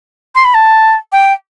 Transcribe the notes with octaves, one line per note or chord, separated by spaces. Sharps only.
C6
B5
A5
G5